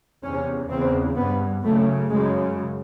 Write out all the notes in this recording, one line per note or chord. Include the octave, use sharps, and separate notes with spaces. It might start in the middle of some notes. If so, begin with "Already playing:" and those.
E2 C3 C#4
E2 C#3 C4
G2 B3
F#2 C#3 A3
F#2 C#3 G#3